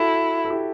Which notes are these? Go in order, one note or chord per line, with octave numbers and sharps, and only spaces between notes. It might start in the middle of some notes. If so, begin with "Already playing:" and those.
Already playing: E4 F#4 A4
A4
E4 G4